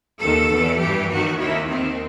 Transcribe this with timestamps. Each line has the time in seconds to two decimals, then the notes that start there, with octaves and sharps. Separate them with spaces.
0.21 D#2 D#3 A4
0.50 E2 B2
0.80 G2 E3 G4
1.09 D#2 D#3 F#4
1.38 D#2 D#3 E4
1.67 D#2 D#3 C4